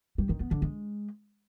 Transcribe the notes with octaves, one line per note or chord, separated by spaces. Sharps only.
G3
D#3
B3
D3
G#3